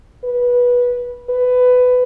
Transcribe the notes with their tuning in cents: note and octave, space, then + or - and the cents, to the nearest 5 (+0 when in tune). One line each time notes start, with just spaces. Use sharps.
B4 -15
B4 +15